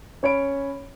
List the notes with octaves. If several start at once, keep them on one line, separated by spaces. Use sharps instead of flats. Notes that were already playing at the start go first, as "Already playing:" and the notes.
C#4 C#5 B5 D7